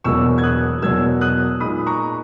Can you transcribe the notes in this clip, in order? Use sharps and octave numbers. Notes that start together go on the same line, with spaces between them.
E1 E2 B2 F#3 A#3 C#6 E6
G#6
D#6 F#6
E1 E2 B2 F#3 A#3 E6 G#6
D#6 F#6
A#2 G#3 D#4 B5 D#6
A#5 C#6